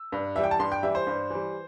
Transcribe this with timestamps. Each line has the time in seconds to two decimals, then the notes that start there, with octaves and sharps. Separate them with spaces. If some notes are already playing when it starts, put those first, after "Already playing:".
Already playing: E6
0.12 G2
0.35 E3 G3 E5
0.44 G5
0.51 A5
0.59 G2 C6
0.72 G5
0.83 E3 G3 E5
0.95 C5
1.07 G2
1.30 E3 G3